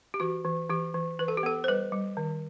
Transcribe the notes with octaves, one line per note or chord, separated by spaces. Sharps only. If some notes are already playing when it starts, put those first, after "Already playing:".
G4
E3 F#4
E3
E3 G4
E3
E3 B4
A4
G4
B3 A4
C5
G3 B4
G3
D#3